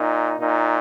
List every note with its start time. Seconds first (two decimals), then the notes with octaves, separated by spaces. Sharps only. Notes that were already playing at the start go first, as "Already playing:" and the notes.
Already playing: A#2 D#4
0.40 A#2 D#4